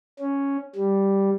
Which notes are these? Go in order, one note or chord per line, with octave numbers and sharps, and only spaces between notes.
C#4
G3